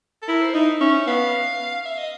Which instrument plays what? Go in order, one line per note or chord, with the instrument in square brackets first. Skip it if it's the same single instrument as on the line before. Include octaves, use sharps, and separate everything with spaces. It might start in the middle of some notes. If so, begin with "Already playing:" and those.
[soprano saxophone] A4
[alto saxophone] E4 [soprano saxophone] A#4
[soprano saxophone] C5
[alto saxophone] D#4 [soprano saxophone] E5
[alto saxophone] C#4 [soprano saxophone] E5
[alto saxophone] B3 [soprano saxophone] F5
[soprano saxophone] E5
D#5